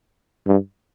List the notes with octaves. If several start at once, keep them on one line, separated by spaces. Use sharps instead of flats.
G2